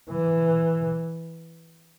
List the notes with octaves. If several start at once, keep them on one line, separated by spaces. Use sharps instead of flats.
E3